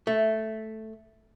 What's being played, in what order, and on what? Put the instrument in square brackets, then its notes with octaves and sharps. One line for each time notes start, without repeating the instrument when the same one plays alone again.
[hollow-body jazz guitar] A3